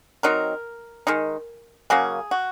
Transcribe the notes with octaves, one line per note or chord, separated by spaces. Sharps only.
F#3 C4 D#4 A#4
D#3 G#3 D#4
C#3 F#3 A#3 C#4 G#4
F#4